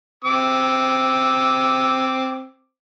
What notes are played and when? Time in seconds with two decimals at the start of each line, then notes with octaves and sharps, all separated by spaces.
0.24 C4 D6 E6